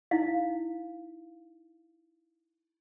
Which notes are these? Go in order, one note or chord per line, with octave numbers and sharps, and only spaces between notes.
D#4 E4 F5